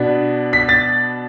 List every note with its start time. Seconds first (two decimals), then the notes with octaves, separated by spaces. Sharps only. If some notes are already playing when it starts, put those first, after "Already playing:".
Already playing: B2 B3 D4
0.53 B6
0.69 A6